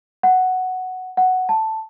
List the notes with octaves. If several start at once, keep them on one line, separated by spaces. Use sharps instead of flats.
F#5
F#5
A5